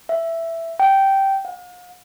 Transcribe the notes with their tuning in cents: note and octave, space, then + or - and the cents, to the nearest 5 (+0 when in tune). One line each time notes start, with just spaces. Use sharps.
E5 +5
G5 -10
F5 +45